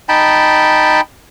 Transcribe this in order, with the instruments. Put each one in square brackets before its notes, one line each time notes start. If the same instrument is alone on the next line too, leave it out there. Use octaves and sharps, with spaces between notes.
[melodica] D#4 G5 A5 B5